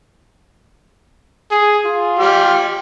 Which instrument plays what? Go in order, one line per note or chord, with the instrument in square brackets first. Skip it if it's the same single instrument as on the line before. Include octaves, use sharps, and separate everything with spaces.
[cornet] G#4
F4
[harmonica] G4 F6